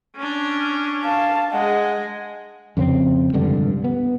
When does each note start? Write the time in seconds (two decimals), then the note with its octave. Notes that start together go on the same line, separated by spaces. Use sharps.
0.16 C#4 D4
1.03 F5 A5
1.52 G#3 G#4 D#5 F#5
2.77 F2 C#3 B3 C4
3.33 F1 C#2 G2 D3
3.84 B3